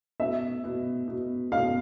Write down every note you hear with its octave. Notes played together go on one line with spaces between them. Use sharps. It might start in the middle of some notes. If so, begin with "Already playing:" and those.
B2 E5
B2
B2
B2 F5